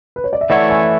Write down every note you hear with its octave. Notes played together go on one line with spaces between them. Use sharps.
B4
C#5
D5
E5
E3 A3 E4 A4 C#5 D5 F#5
E5 G#5